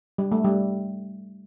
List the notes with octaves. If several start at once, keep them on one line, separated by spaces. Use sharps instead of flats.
G3
A3
G3